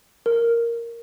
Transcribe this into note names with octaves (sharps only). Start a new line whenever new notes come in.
A#4